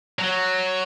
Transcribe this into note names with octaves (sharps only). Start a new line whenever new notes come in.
F#3